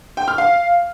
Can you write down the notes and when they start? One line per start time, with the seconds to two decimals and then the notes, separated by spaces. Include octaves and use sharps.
0.17 G5
0.28 F6
0.38 F5